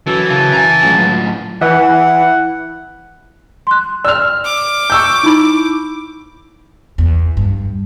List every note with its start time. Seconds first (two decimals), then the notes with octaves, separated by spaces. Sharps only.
0.07 F#2 E3 A4
0.30 C#3 A5
0.53 G#5 A#5
0.82 C#2 A2 F#3
1.61 E3 F#5
3.67 C6 F#6
4.05 D5 E6 F6
4.45 D6
4.90 C#6 E6 G6
5.23 D#4 E4 B5
6.98 E2
7.37 G2